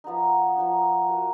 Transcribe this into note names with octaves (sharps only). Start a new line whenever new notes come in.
F3 B3 D#4
F3 B3 D#4
B3 F#4 A#4